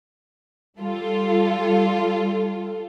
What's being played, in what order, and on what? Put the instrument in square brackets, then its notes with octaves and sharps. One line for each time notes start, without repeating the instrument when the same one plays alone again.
[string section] G3 F4 A4